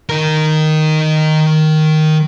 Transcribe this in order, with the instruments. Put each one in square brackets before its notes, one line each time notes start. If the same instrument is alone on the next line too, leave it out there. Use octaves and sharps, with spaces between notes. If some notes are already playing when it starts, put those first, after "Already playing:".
[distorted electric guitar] D#3 A#4